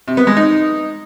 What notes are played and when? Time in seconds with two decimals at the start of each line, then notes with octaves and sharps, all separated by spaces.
0.08 C3
0.17 B3
0.27 G#3
0.37 D#4